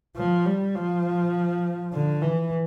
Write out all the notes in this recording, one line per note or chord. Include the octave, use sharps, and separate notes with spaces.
F3
G3
F3
D3
E3